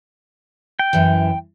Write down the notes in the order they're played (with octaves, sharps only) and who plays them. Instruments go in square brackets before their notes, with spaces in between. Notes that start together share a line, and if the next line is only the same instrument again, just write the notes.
[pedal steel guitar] G5
[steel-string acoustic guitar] F#2 E3